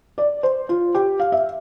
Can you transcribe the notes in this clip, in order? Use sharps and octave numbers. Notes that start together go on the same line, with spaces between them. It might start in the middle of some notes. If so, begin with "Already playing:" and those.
D5
C5
F4
G4
F5
E5